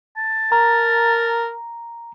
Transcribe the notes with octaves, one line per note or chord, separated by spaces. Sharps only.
A5
A#4 A#5